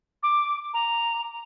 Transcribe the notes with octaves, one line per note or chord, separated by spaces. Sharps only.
D6
A#5